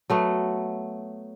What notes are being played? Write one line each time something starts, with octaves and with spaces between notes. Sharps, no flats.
F#3 A3 B3